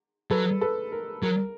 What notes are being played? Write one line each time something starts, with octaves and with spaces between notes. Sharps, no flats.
F#3 A4 B4
A4 B4
A#4
F#3 A#4